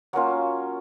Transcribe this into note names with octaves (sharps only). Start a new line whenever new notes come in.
F#3 A#3 C#4 F4 F#4